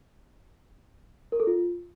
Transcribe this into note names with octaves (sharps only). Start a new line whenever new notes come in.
A#4
A4
F4